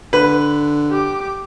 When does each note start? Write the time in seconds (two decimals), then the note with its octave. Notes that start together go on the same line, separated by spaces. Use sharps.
0.13 D3 B4
0.90 G4 D6